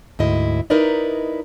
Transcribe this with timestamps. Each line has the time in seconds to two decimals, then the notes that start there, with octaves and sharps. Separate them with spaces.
0.19 D2 G#2 E4 D#5
0.70 D#4 E4 A#4 B4 D5 D#5